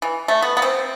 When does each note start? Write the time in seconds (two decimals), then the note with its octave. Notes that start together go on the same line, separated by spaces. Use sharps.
0.02 E3
0.28 A3
0.42 B3
0.57 B3
0.62 C4